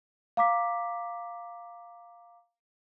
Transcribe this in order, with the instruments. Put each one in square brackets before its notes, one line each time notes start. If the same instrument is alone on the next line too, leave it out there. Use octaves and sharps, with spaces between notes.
[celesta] F5 A#5 D6 B6